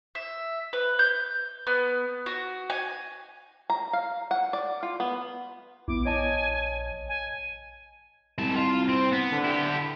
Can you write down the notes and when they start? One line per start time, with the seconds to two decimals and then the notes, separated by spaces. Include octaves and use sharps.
0.15 E5
0.73 B4
0.99 G6
1.67 B3
2.26 F#4
2.70 G#5
3.70 A#5
3.93 F5
4.31 F#5
4.53 D5
4.83 F4
5.00 B3
5.88 A#1 B3 E4 D6
6.05 C#5 D#5 G#5 A5
7.09 G#5
8.38 C2 G#3 A5
8.57 F4
8.89 C4
9.13 B3
9.32 D3
9.45 E4 G4